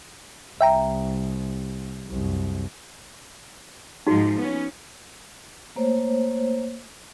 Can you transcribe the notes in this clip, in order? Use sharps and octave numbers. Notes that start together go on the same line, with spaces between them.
C2 E5 G5 A#5
C2 F#2
G#2 F3 D#4 F#4
B3 C#4
A3 A#3 C5 C#5